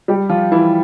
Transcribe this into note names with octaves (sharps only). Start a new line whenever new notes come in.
G3 G4
F3 F4
E3 E4